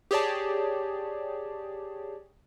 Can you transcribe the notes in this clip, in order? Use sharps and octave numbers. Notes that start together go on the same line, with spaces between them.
G4 G#4 C#5 D5 A5